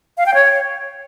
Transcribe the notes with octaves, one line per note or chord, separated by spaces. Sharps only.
F5
G5
C#5